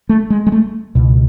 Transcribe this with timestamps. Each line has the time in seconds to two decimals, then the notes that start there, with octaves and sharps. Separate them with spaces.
0.09 A3
0.30 G#3
0.47 G#3
0.52 A3
0.95 C#2 B2